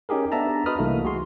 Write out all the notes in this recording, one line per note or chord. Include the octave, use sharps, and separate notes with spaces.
C#4 D#4 G4 G#4 A#4
B3 D4 A4 E5 A5 A#5
F#4 B4 D#5 B5 D#6 F6
C2 E3 A3 A#3 D#4
F#4 G#4 C6